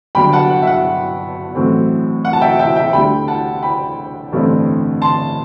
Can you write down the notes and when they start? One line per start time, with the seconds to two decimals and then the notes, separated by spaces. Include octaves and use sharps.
0.15 G1 G2 F#3 G5 B5
0.33 F#5 A5
0.50 F#5
0.62 E5
0.67 F#5
1.55 A1 A2 F#3 A3 C4
2.25 F#5
2.33 A5
2.41 E5 G5
2.59 E5 G5
2.76 E5 G5
2.93 D2 D3 G3 G5 B5
3.28 F#5 A5
3.63 G5 B5
4.32 A1 G2 D3 A3 C4
5.02 A5 C6